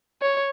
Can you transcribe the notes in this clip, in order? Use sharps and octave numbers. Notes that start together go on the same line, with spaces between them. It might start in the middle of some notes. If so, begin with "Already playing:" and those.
C#5